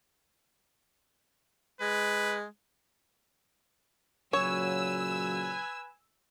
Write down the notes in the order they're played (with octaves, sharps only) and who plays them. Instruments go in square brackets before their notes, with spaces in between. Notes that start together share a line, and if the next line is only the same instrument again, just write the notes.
[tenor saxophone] G#3 [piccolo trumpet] B4
[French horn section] A#2 C#3 F#3 [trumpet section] B4 G#5 [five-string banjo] C#5 [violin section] E6